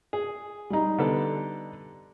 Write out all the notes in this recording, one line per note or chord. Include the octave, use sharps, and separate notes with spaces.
G#4
G3 D#4
D3 B3 A4